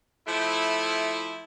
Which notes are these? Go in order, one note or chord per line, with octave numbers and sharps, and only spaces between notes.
F3 A3 E4